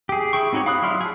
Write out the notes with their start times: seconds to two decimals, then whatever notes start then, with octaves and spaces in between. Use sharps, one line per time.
0.09 G4 G#4
0.33 E4 G#4 G5 C#6
0.53 C4 D#4 F#4 G4 C#5
0.66 F5 B5 D#6 F#6
0.82 F#3 E4 D5 C6 F6
1.01 G#4 A5